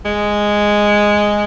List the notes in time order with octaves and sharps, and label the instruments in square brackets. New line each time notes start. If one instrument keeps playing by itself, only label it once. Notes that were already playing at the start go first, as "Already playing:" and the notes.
[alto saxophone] G#3